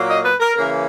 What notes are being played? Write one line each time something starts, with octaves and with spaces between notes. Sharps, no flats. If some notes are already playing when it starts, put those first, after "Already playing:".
Already playing: A#2 F#3 A#3
D#5
B4
A#4
C#3 E3 A#3 C#4 A#4